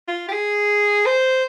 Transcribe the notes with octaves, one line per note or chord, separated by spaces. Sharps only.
F4
G4
G#4
C5